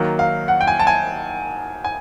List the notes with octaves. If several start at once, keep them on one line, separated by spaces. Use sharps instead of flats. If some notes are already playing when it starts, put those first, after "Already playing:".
Already playing: D#3 F#3 A#3
F5
F#5
G5
G#5
A5
G#5
G#5